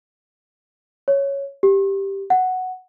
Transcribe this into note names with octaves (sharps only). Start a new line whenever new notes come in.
C#5
G4
F#5